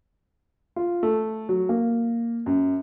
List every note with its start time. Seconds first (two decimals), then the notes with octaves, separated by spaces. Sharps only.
0.76 F4
1.03 A3
1.49 F#3
1.69 A#3
2.46 F#2